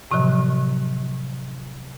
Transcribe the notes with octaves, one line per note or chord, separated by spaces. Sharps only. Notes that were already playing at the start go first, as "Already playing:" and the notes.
A2 C3 D#3 F3 F#3